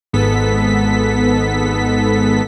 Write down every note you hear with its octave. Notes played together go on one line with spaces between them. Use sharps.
G#1 G#2 B3 A4 B6